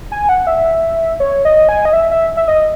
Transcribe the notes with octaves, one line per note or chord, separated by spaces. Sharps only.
G#5
F#5
E5
C#5
D#5
G#5
D#5
E5
E5
E5
D#5